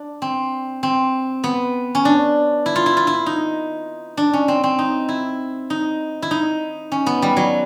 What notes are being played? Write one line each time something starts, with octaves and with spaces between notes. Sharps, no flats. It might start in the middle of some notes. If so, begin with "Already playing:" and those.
Already playing: D4
C4
C4
B3
C#4
D4
E4
F4
E4
F4
E4
D#4
D4
C#4
C4
C4
D#4
E4
D#4
E4
D#4
C#4
B3
G3
F#3